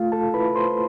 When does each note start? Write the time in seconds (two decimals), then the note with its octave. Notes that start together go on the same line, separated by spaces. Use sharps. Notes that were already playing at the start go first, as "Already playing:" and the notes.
Already playing: A3 F4 F5
0.12 A4 A5
0.34 E4 B4 B5
0.55 C5 C6